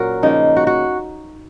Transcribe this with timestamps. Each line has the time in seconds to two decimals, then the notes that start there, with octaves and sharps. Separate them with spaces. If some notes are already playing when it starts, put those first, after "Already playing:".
Already playing: A#2 F#3 C#4 F#4 A#4
0.23 C#3 F3 A#3 D#4
0.56 F#4
0.67 F#4